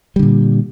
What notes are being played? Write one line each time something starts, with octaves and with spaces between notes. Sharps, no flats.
A#2 D3 G3